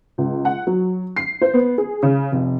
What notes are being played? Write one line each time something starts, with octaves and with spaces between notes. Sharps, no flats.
C#2
F#5
F#3
C7
C5
B3
G#4
C#3
F1